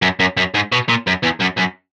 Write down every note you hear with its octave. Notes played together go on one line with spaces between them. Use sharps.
F#2
F#2
F#2
G#2
B2
A#2
F#2
E2
F#2
F#2